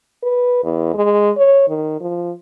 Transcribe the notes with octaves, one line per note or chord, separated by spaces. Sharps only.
B4
E2
G#3
C#5
D#3
F3